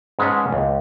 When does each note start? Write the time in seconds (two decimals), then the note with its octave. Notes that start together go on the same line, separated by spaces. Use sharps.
0.19 G#2 G#3 C#4 B4 F#5 A5
0.52 C#2